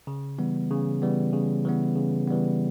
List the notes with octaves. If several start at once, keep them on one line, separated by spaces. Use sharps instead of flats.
C#3
E3 G3 B3
C#3
E3 G3 B3
C#3
E3 G3 B3
C#3
E3 G3 B3